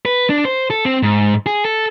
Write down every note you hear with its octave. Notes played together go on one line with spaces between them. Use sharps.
B4
D4
C5
A4
C4
G#2
G#4
A4